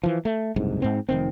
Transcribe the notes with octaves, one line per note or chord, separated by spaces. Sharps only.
E3 F3
A3
F#1 C2 G#2
G#2 C4
F1 D#3 C4